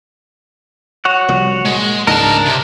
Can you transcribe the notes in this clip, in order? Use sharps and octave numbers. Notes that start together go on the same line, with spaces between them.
F#4 C#5 F#5
C2 F3 G3
A#2 G#3
C#2 G#2 D4 A#4 D#5 A5
C3